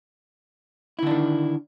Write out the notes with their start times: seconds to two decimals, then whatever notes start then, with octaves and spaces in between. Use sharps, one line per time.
0.99 E4
1.03 D3
1.07 D4
1.11 D#3